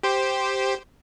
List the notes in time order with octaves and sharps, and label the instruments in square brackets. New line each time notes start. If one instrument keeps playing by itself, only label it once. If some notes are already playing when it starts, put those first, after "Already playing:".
[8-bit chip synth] G4 C5